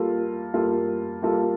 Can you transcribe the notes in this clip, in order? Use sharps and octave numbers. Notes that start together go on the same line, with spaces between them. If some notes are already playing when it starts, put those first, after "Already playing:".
Already playing: G3 A#3 F4 A4
G3 A#3 F4 A4
G3 A#3 F4 A4